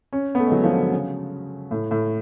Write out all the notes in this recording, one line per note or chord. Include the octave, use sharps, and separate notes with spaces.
C#4
B3
A3
G#3
F#3
F3
D3
C#3
A2
A2